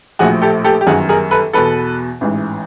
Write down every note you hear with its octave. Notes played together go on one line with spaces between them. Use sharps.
A#1 A2 F3 F#4 G#4
G4 A4
G4 A4
G4
G1 F#2 D#3 F#4 G#4
G#4 A#4
A4 B4
E2 B2 A4 B4
A1 G#2 E3